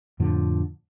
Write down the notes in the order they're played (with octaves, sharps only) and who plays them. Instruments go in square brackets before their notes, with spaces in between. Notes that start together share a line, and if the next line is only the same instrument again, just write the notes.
[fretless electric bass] F2 A2 D3 F3